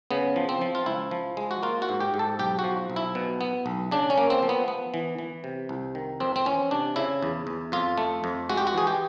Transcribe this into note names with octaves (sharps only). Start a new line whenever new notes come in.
C#3 B3
F3
C4
F3
F4
C#2 E4
F3
G#3
F#4
A#3 F4
F#4
G#2
G4
G#2
A4
B1 G4
F#4
F3
B1
E4
B2
B3
B1
C#3 D4
C#4
A#3
C4
F3
B3
B3
E3
E3
C3
C2
D#3
F2 C4
C4
E3 C#4
C3 D4
C#3 E4
E2
E2
F2 F4
A3
F2
G#3 F#4
G4
F#4
E3 G#4
G4